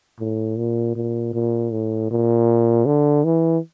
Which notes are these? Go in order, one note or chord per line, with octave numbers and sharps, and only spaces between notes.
A2
A#2
A#2
A#2
A2
A#2
D3
E3